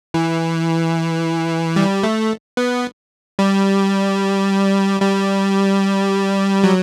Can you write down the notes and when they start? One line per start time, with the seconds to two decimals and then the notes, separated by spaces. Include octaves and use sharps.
0.14 E3
1.76 G3
2.03 A3
2.57 B3
3.39 G3
5.01 G3
6.63 F#3